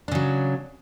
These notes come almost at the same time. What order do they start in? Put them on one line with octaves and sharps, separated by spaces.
D4 C#3 F#3